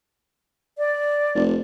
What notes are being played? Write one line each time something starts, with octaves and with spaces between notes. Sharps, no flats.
D5
F1